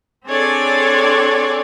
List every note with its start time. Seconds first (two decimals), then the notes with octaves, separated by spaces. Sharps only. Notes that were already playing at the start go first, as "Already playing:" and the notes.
0.26 C4 D4 G#4 A4 C#5 D5